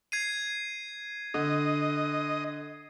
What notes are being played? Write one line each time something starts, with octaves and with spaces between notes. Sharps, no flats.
G#6 C7 D#7
D3 D#5